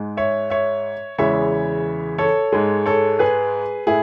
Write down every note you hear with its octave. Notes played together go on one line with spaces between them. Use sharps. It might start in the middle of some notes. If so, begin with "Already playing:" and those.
Already playing: G#2 G#3
C#5 E5
C#5 E5
E2 C#3 E3 G#3 C#5 E5
A4 C#5
G#2 G#3
A4 C#5
G#4 B4
A2 E4 G#4